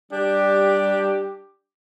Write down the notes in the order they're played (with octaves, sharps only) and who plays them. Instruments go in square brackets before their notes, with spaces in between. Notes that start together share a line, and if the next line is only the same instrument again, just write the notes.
[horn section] G3 D4 G4